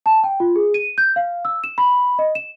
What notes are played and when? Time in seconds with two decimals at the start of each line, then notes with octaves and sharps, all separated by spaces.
0.06 A5
0.24 G5
0.40 F4
0.56 G#4
0.74 D#7
0.98 G6
1.16 F5
1.45 E6
1.64 E7
1.78 B5
2.19 D#5
2.35 E7